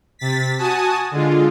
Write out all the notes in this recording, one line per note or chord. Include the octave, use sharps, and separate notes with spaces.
C3 A6 B6
F#4 G#5 A5 D#6
D3 G#3 F4